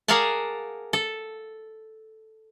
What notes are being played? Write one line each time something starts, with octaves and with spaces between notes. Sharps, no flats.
G#4 A#4 D5 F5 F#5 A5
A4